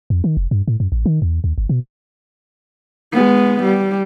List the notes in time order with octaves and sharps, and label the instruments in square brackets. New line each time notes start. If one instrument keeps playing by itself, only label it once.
[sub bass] F2
D#3
F1
G2
A2
F#2
A1
D#3
E2
D#2
G1
B2
[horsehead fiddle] G#3 B3
G3